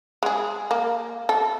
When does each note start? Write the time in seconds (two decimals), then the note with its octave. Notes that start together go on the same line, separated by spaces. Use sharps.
0.23 G#3 G#4
0.71 A#3
1.29 A4